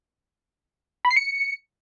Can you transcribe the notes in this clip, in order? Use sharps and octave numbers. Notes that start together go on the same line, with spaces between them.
B5
C7
C#7